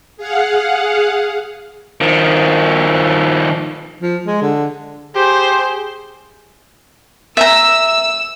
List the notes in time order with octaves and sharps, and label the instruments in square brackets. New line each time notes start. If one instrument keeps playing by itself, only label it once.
[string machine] G#4 F5 F#5
[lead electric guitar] D#3 F3
[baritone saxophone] F3
G#3
D3
[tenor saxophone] G4 [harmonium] G#4 [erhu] C5
[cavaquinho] E5 A#5 [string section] E6